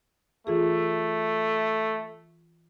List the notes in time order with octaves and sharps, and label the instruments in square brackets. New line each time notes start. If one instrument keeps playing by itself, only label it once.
[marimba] E3 F4 G#4 [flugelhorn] A3